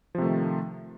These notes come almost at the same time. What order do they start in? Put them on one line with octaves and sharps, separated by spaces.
F3 C3 A3 D#3